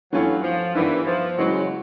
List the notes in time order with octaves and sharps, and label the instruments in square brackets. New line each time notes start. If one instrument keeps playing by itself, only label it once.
[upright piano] G2 E3 A3 C#4 F4 [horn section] F#3
[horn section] F3
[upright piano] G2 D#3 G3 B3 [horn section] E3
[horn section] F3
[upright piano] C#3 E3 G#3 [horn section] F#3